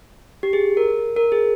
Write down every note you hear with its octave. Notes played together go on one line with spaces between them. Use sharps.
G4
G#4
A#4
A#4
G#4